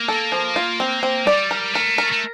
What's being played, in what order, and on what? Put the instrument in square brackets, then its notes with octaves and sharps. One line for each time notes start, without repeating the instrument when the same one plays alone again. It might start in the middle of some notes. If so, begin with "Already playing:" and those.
Already playing: [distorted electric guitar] A#3
[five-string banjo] A4
F3
F4
C4
C4
[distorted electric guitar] G3 [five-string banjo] D5
[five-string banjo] A#4
[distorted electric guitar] A3 [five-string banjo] A#4
[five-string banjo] A#4
[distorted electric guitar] A3